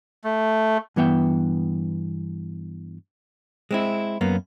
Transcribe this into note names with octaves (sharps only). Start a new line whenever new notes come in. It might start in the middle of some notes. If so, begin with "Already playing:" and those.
A3
G2 E3 B3 E5 G5
G#3 C4 E4
F#2 A#3 B3